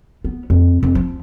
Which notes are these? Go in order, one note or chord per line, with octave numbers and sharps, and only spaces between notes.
B3
F2
F2
F3